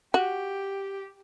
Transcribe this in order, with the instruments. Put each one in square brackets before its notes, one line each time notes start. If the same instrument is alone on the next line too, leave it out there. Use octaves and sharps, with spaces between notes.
[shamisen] F#4 [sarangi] G4